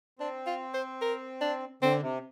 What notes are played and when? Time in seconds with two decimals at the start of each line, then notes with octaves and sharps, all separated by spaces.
0.19 C4 D4
0.46 F4
0.74 C5
1.01 A#4
1.41 D4
1.82 D3 C4
2.02 C3